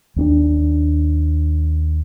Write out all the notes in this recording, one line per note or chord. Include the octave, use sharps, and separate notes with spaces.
D#2 C4 D4